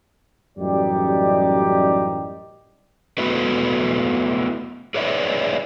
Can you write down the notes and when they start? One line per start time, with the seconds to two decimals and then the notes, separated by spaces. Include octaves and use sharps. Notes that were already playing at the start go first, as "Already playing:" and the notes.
0.58 A1 F#2 G3 D#4 G4 D5
3.18 A3 B3 E4 F#4 B4
4.94 G#4 B4 C#5 D5 E5